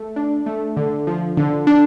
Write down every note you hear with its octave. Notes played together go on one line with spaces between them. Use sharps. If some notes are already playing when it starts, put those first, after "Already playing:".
Already playing: A3
D4
A3
D3
F3
D3
D4